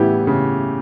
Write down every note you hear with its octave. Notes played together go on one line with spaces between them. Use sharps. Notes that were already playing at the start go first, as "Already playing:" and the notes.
Already playing: A2 C#3 E3 B3 E4 G4
C#3